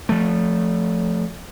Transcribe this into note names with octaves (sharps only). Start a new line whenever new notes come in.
F3 A3